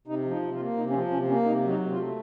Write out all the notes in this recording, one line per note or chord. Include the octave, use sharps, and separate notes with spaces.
C3 D#4
F3
D#4
C3
F4
A#3
C3 D#4
C#4
F3 C4
C3 C#4
A#3 C#4
C3 D#4
F#3
D#4
C3
F4
A3